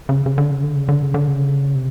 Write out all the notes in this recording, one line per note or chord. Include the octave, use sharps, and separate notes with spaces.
C#3
C#3
D3
C#3
D3
C#3
D3
C#3
D3
C#3
C3